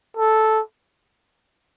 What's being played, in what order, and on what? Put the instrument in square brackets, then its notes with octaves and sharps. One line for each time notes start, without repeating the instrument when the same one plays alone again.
[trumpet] A4